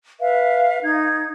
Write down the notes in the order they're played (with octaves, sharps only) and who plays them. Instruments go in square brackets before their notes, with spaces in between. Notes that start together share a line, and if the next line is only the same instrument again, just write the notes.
[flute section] B4 E5 F5
D#4 G#6